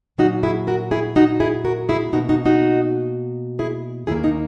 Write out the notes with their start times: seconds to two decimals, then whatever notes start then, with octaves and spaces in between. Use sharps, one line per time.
0.18 A#2 F#3 A#3 D#4 F#4
0.43 E4 G#4
0.67 F#4 A#4
0.91 E4 G#4
1.16 D#4 F#4
1.40 E4 G#4
1.65 F#4 A#4
1.89 E4 G#4
2.13 B2 A#3 D#4 F#4
2.29 D#4 F#4
2.46 D#4 F#4
3.59 E4 G#4
4.07 D#2 D#3 A#3 E4 G#4
4.24 D#4